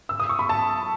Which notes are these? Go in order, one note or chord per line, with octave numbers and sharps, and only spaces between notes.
E6
D#6
C#6
B5
A5